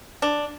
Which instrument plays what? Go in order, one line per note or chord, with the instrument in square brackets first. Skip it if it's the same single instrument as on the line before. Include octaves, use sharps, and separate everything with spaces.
[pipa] D4